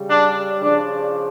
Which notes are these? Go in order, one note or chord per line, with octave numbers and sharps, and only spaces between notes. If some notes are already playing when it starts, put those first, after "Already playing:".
Already playing: C#3 G3
D4
C#3 F3 D4